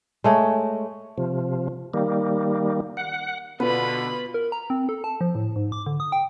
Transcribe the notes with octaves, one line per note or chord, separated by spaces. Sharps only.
G#3 A3 C#5
C3 F3
D#3 G3 A#3
F#5
B2 D3 B3 F4 B4 B5
A#4
A#5
C4
A4
A5
F3
A2
G#2
D6
D3
D#6
G5